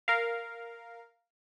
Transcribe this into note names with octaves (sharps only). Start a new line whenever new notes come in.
A#4 F5